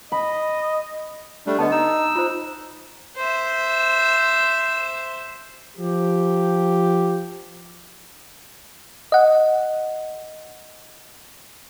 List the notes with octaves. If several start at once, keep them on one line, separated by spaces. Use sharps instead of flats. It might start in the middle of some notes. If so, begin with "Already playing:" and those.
D#5 B5
G3 A3 D4
D3 B3 D#5 A5
D#4 E6
F4 C5
C5 E5
F3 G4
D#5 F#5